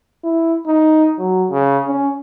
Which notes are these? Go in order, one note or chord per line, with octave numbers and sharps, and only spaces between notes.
E4
D#4
F#3
C#3
C#4